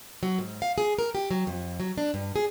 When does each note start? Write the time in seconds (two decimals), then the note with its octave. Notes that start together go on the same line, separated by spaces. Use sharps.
0.23 F#3
0.39 G#2
0.62 F5
0.78 G#4
0.99 A#4
1.15 G4
1.31 F#3
1.47 F2
1.80 F#3
1.98 D4
2.14 G2
2.36 G#4